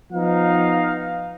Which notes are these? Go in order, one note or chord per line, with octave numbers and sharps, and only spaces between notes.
F3 B3 D#4 F5